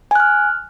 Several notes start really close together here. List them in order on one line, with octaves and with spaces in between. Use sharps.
G#5 F#6 F6